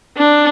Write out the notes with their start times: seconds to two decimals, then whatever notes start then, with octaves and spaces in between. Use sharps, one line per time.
0.17 D4